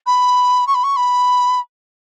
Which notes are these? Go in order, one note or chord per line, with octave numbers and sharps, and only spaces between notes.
B5
C#6
B5
C#6
B5